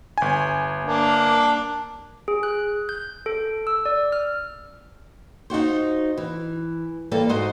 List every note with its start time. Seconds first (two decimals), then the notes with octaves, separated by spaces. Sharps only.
0.18 G1 G#5
0.84 A#3 D4
2.28 G#4
2.43 F#6
2.89 G6
3.26 A4
3.67 E6
3.86 D5
4.12 F6
5.50 D#4 F4 F#4 C5
6.17 E3
7.11 E3 G3 A#3 A4
7.29 G#2 F#4 C5 D#5